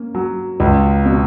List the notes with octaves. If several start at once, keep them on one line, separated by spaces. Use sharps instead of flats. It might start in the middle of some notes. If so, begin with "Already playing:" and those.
Already playing: A#3 C#4
F#3
C#2
B2